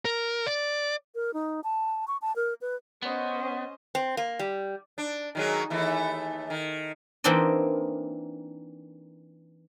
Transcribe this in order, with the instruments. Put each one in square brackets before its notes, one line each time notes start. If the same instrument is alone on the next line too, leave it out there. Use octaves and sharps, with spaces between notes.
[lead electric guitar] A#4
D5
[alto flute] A#4
D#4
A5
C#6
A5
A#4
B4
[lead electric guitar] B3 [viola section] C#4 C5 D#5
[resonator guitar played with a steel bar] C4
A#3
G3
[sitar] D4
D#3 F#3 G#3
D#2 E3 A3
D#3
[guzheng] E3 A#3 C4 D4 D#4 D#5